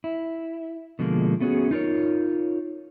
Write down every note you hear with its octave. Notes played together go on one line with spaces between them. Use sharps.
E4
B2 D3 F3 G#3 A#3
A3 B3 C#4 F#4 G#4
D#4 F4 A#4 C#5